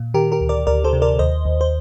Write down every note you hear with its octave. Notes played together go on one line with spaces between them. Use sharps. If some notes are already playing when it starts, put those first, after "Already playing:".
Already playing: A#2
D#3 G4 A#4
G4 A#4
D2
A#4 D5
D2 A#4 D5
A4 C5
C3
A#4 D5
D#2 C5 D#5
D#2
C5